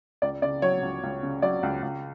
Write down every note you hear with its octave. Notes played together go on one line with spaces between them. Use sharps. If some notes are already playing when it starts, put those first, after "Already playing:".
C#2 D5
C#3 D5
F#3 C#5
C#2
C#2
C#3
F#3 D5
C#2
C#2